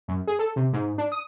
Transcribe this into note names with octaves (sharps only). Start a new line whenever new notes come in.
F#2
G#4
A4
C3
G#2
D4
D#6